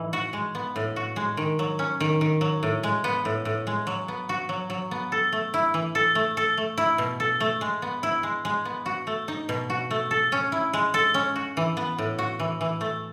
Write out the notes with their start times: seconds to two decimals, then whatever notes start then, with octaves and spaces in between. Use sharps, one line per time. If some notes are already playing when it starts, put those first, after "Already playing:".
Already playing: A2 E3 D#4
0.13 F#4
0.33 G#3
0.55 B3
0.76 A2
0.96 F#4
1.16 G#3
1.37 D#3
1.59 F#3
1.79 C#4
2.00 D#3
2.21 D#3
2.41 F#3
2.63 A2
2.83 G#3
3.04 B3
3.25 A2
3.45 A2
3.67 G#3
3.87 F#3
4.08 B3
4.29 F#4
4.49 F#3
4.70 F#3
4.91 B3
5.12 A4
5.32 A3
5.54 E4
5.74 E3
5.95 A4
6.15 A3
6.37 A4
6.57 A3
6.78 E4
6.98 B2
7.20 A4
7.40 A3
7.61 G#3
7.82 B3
8.03 E4
8.23 G#3
8.45 G#3
8.65 B3
8.86 F#4
9.07 A3
9.28 D#4
9.49 B2
9.70 F#4
9.91 A3
10.11 A4
10.32 C#4
10.52 E4
10.73 G#3
10.94 A4
11.14 C#4
11.36 F#4
11.57 E3
11.77 B3
11.98 A2
12.19 F#4
12.40 E3
12.61 E3
12.81 A3